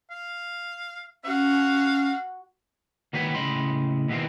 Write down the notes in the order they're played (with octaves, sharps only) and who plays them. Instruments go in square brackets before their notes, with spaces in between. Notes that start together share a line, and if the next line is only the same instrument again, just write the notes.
[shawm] F5
[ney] C#4 [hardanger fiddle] F#4 [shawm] F5
[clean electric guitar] D#3 A#3 F#4 B4 C#5 G5
A2 C#3 D#5 G5 B5 C6
D#2 B2 E3 G3 A#3 C4